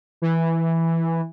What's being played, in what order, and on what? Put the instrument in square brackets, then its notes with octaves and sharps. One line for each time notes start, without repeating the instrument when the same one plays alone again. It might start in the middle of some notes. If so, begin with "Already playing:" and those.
[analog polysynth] E3